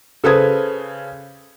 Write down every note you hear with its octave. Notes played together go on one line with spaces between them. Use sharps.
C#3 A4 B4 C5 D#6 G#6